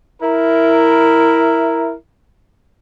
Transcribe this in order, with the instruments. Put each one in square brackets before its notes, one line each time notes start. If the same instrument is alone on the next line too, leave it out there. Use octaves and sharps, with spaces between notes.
[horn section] E4 A#4